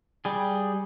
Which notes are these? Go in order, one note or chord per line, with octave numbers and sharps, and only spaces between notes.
G3 G#4